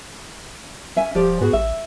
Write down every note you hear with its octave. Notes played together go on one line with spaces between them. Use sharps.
C#4 E5 G#5
D1 F3 G4 D5
G#2 B3 F#4 G#4
A1 E5